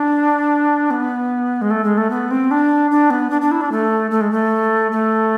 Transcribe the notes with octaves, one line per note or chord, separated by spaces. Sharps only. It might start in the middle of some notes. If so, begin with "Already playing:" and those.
Already playing: D4
B3
G#3
A3
G#3
A3
B3
C4
D4
D4
B3
D4
D4
E4
D4
A3
A3
G#3
A3
A3